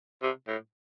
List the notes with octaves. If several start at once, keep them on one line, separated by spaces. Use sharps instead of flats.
C3
A2